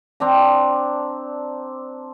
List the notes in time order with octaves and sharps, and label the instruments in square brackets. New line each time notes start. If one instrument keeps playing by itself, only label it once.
[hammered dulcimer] C4 D4 A#5